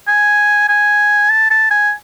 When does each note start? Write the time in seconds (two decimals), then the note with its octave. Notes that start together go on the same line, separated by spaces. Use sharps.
0.08 G#5
0.69 G#5
1.30 A5
1.51 A5
1.71 G#5